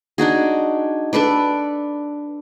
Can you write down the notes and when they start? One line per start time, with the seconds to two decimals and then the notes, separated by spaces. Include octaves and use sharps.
0.18 D4 D#4 F#4 G#4
1.13 D4 A4 B4 D5